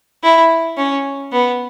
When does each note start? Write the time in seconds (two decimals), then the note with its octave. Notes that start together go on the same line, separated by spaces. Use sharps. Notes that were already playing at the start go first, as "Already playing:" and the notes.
0.23 E4
0.77 C#4
1.32 B3